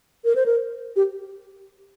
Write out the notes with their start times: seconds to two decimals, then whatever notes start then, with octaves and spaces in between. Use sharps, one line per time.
0.25 A#4
0.36 C5
0.46 A#4
0.96 G4